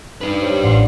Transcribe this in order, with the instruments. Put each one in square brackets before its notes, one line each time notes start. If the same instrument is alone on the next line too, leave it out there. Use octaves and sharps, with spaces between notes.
[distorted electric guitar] D4 B4 [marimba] D#4
[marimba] G4 C5 C#5
[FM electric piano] A1 F4 C6 [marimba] D5 F#5